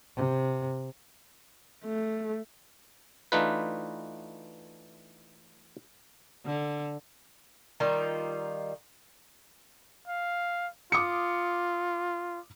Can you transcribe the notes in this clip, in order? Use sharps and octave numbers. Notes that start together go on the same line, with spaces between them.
C3
A3
E3 A3 D4 D#4 F4 B4
D3
D#3 G3 D#4 F4
F5
F4 D6 D#6 C#7